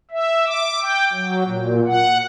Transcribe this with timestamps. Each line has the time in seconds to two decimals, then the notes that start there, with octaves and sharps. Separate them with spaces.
0.11 E5
0.47 D6
0.81 G5
1.13 F#3
1.45 A#2
1.86 F#5